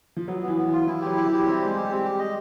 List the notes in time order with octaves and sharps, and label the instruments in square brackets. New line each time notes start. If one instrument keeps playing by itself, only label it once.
[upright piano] F3
[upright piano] F#3 [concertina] B3
[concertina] B3
[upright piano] E3
[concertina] B3
[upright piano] E3
[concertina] F4
[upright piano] E3 [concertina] E4
[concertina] G4
[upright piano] F#3
[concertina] E4
[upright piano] E3 [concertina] G4
[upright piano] G3 [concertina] C4
[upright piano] G#3 [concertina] C5
[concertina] G4
[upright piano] G3
[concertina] C4
G4
D#5